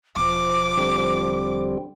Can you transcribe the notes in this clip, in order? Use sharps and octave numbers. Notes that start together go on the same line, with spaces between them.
E1 F3 D6
D3 G3 C4